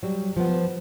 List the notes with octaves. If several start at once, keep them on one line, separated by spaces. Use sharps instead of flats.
F#3 G3
F3 B3